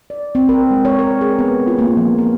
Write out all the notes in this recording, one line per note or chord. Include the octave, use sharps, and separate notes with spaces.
D5
C4
A#4
G#3
C#5
A#4
G#4
B3
F4
A#3
F3
A#4